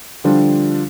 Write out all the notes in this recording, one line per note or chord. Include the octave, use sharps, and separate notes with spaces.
D3 F3 G3 D4 F4